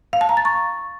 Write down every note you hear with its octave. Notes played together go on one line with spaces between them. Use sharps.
F5
A5
A#5
A6
C#6